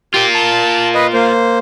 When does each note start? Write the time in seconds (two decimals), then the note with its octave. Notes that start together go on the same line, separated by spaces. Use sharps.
0.14 F4 G4 A#4
0.35 A5
0.95 B4 D#5
1.13 A#3 C5